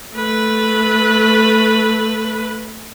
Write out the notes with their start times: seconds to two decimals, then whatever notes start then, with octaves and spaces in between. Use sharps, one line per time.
0.15 A3 B4